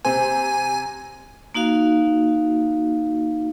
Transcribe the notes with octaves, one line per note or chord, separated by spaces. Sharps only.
C3 C4 C5 G#5
A#3 D#4 F#4 F5